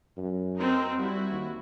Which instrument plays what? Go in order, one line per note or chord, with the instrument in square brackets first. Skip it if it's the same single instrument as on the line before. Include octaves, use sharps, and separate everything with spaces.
[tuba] F#2
[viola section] C4 D#4 A#4
[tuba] G3 [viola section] E4 F#4
[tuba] D#2